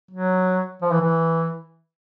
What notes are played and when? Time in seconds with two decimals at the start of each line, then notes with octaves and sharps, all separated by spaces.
0.11 F#3
0.82 F3
0.91 E3
1.02 E3